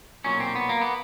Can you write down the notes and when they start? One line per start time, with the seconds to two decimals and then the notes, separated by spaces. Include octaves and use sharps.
0.24 B1 A#2 F#3 C#4
0.40 C4
0.55 B3
0.69 A#3
0.81 B3